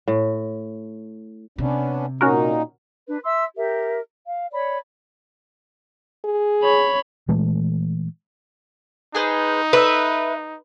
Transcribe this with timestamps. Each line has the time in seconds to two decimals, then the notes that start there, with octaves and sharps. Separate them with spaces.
0.07 A2
1.58 C3 B3 C#4 D4
2.21 A#2 C#4 D#4 F#4 A#4
3.07 D4 B4
3.24 E5 C6 E6
3.56 G4 A#4 E5
4.27 F5
4.53 C#5 D5 B5
6.24 G#4
6.63 C#5 B5
7.28 A#2 E3 G#3 A3
9.15 D#4 G#4 B4 C5
9.73 B4 E5 E6